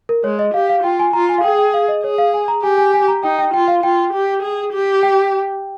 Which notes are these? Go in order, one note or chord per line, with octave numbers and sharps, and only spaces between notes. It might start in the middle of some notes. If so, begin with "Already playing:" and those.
A#4
G#3 C#5
D#5
G4 F5
F5
F4 G5
G#5
F4 A#5
G#5
F5
G#4 G5
G5
F5
D#5
G#4 C#5
F5
G#5
A#5
G4 G#5
G#5
G#5
A#5
D#4 G5
G5
F4 G5
F5
F4 G5
G4
G#4
G4
G5